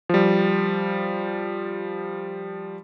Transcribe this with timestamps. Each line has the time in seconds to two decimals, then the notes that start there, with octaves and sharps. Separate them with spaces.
0.09 F3 G3